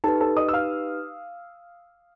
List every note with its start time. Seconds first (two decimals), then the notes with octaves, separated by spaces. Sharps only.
0.04 D#4 G4 A4 B4 A5
0.21 A4 A5
0.37 D#5 D#6
0.49 E6
0.53 F5 F6